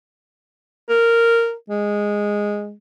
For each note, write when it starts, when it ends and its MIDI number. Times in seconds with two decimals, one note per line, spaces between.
0.89 1.54 70
1.70 2.74 56